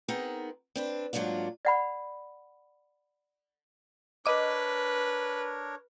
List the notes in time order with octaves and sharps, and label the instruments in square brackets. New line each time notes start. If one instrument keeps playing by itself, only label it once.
[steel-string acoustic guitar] B3 C4 D#4 G#4 A#4
C4 D4 B4
G#2 F#3 A#3 D4 F4
[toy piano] D5 F#5 B5
[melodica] D4 A#4 C#5 [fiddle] B4 [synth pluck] D#5 D6